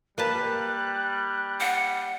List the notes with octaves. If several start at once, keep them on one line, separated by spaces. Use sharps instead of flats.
G3 A#3 B4 A5 F#6
F#5 C#7